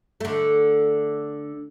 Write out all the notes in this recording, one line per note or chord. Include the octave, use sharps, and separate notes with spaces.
D3 A3